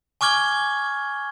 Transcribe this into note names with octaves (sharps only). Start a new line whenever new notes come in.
G#5 C#6 D6 F6 G#6 G7